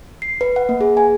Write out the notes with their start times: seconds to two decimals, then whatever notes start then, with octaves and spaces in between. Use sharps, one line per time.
0.22 C7
0.41 B4
0.56 F#5
0.69 A#3
0.81 G#4
0.97 G#5